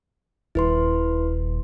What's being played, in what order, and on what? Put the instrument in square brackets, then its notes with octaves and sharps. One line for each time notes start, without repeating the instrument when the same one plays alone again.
[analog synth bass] D#1 [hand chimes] E4 B4 C6